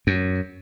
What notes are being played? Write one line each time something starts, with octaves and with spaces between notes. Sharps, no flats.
F#2